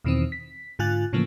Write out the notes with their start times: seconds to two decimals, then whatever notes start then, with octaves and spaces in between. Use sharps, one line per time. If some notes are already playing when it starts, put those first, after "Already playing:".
0.04 E2 B2 D#3 E3 C4
0.32 B6
0.79 G#2 D3 F4 G#5 F#6 A6
1.13 A2 C#3 E3 F3 A3 A#3